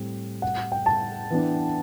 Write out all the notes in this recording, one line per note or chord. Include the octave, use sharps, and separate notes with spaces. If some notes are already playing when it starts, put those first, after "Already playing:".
Already playing: A2 G3 C4
F#5
G5
A5
E3 B3 D4